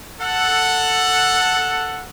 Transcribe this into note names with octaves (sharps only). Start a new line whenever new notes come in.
A4 F#5